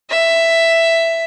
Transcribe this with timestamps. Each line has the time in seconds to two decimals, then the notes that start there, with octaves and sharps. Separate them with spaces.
0.11 E5